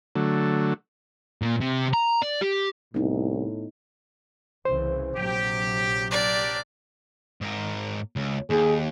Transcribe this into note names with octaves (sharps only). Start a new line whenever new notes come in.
D3 F#3 A3
A#2
C3
A#5
D5
G4
C2 A2 B3 D#4
C2 C#3 E3 C5
A#1 C3 F#3 G4
D4 G4 A#4 D5
G#2 A#4
C#2
D#2 G#4